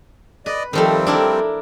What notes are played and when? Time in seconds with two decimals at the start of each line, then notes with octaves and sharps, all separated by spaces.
0.46 B4 D5 D#5
0.73 D#3 F3 G3 A3 C4
1.07 D4 E4 A#4